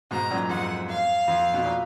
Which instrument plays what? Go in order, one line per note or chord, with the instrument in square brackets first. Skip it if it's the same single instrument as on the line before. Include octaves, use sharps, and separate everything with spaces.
[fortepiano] G#2 B2 [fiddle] A#5
[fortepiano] F#2 A#2
[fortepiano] F2 G#2 [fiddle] F#5
[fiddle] F5
[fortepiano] F2
B2
A#2